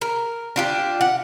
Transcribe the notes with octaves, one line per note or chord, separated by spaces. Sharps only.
A#4
D4 F4 G4
F#5